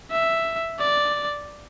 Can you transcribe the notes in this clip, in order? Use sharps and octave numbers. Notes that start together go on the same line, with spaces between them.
E5
D5